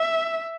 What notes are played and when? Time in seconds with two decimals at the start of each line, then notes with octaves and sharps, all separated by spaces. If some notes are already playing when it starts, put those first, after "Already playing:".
Already playing: E5